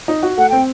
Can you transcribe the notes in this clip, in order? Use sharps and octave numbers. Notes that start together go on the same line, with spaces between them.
D#4
F#4
A3 F#5
C4 G5